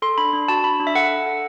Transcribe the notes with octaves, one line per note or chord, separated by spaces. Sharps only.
A4 C6
D4 B5
D4
F#4 A5
D4 B5
D4
E5
A4 F#5
A4
A4